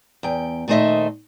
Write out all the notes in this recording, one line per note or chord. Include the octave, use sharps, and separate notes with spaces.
E2 G5
A#2 D#3 A3 C5 D#5 E5